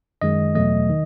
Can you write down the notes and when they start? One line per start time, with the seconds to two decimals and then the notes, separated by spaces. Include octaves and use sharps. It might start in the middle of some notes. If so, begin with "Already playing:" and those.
0.22 F#2 D#3 G#3 D#5
0.55 E2 B2 F#3 A3 D#5
0.90 D#3